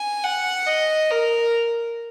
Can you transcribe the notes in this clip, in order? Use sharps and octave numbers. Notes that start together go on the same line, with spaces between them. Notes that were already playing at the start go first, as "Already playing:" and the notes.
Already playing: G#5
F#5
D#5
A#4